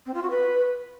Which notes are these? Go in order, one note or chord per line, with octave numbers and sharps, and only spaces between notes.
C4
F4
F#4
B4